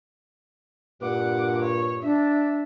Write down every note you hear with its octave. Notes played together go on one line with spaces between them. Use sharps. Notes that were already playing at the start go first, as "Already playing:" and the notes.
G2 A#2 F#5 D6
C#5
D4 E5